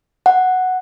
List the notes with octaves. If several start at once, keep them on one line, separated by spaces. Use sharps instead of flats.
F#5